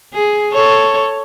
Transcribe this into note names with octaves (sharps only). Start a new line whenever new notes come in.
G#4
A4 C#5